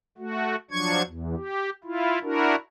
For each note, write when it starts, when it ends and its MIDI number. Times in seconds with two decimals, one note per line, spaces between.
0.18 0.56 57
0.18 0.56 66
0.71 1.02 53
0.71 1.02 54
0.71 1.02 62
0.71 1.02 85
0.71 1.02 92
1.06 1.35 40
1.36 1.70 67
1.84 2.19 64
1.84 2.19 65
2.23 2.55 62
2.23 2.55 64
2.23 2.55 66
2.23 2.55 70